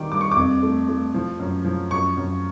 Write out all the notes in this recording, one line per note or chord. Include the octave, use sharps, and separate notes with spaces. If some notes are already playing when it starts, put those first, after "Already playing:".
Already playing: D#3 G3 D6
G2 D6
C#6
F2 D6
A3
A3
F3
F#2
F3
F#2 C#6
F#2